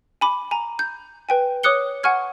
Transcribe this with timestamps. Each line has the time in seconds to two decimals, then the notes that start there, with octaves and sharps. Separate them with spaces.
0.21 G#5 B5 D6
0.51 G#5 A#5
0.79 G6
1.29 B4 G5 G#5
1.63 C#5 D6 D#6 F#6 C#7 G7
2.03 F#5 G#5 C#6 F6 G#6